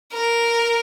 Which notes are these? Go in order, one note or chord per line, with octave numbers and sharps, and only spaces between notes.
A#4